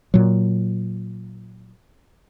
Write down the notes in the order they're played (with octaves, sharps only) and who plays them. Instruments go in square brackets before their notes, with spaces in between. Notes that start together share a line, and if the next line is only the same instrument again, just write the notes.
[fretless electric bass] A#2 F#3